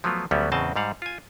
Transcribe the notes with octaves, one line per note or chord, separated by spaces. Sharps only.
F3 F#3 A3 B3 F4
D2 F#3 G3 B3 C#4
E2 A2 C#3 C4 D#5 A5
G#2 G3 F5 F#5
F4 G#5